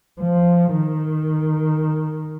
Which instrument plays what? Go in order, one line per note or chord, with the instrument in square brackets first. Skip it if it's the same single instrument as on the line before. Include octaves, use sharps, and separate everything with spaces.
[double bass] F3
D#3